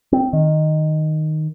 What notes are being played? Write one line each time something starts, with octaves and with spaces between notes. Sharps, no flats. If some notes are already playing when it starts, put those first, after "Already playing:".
C4
D#3